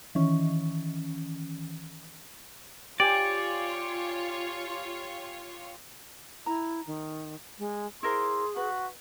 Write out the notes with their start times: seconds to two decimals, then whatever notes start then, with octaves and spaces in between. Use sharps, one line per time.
0.15 D#3 E3 C#4
3.00 F4 G4 C#5 D5 G#5
6.46 E4 A#5
6.87 D#3
7.59 G#3
8.03 E4 G#4 A#4 C5 C6
8.56 F#4 B4